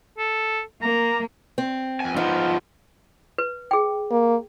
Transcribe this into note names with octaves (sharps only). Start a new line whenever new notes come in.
A4
A#3 A#5
C4
F2 G#5
F3 B3 D#4 F4
B4
G#4 G5
A#3